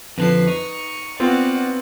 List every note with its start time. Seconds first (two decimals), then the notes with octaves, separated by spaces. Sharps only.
0.18 F2 D3 F3 B4 C7
0.47 D#4 C#6
1.20 B3 C4 F4 F#4 D5